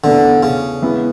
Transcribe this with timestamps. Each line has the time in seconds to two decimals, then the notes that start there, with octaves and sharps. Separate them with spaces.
0.04 E2 B2 D3 A3 D4
0.43 C#3
0.82 E3 G#3 B3